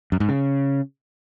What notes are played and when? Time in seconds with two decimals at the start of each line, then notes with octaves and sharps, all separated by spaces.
0.12 F#2
0.20 G#2
0.29 C#3